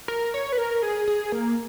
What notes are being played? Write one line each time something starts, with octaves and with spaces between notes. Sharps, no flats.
A#4
C#5
B4
A#4
G#4
G#4
A#3